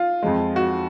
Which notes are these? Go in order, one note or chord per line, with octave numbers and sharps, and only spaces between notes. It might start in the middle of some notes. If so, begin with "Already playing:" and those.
Already playing: F4
F2 F3 G#3
F#4